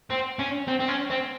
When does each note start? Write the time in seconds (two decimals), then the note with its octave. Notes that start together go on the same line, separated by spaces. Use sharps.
0.10 C4
0.39 C#4
0.68 C4
0.80 C4
0.89 C#4
1.10 C4